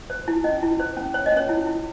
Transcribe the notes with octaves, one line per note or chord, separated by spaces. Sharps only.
C5
E4
C#4 D#5
E4
C5
C#4
C5 C#5
D#5
C#4 C#5
E4
E4